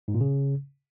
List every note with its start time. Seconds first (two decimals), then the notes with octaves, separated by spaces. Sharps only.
0.08 G#2
0.14 A#2
0.21 C#3